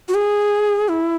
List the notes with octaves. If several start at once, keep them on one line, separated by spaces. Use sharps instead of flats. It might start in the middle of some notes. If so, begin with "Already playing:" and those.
F#4
G#4
E4